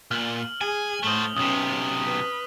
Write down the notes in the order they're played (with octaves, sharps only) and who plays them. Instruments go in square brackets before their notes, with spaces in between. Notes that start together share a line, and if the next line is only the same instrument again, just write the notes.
[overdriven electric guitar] A#2 [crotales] F6 F#7
[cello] G#4 [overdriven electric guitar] G#5
[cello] A2 [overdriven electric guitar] A3 C5 [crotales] D#6 F#7 G7
[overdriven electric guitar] B1 C3 [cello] C#4 B4 [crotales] D#6
[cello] B4